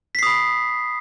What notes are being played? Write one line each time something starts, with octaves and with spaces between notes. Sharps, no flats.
B5 D#6 B6 C7